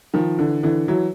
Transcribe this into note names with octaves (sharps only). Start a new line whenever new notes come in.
D#3 F3
D3 E3
D3 E3
E3 F#3